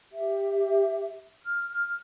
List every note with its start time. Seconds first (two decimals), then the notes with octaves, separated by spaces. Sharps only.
0.13 G4 E5
1.43 F6